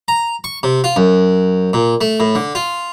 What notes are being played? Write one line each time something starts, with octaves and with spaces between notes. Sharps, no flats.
A#5
C#6
C3
F4
F#2
A#2
A3
A2
D3
F4